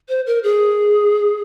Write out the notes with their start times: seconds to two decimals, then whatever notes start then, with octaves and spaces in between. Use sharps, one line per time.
0.09 C5
0.27 A#4
0.43 G#4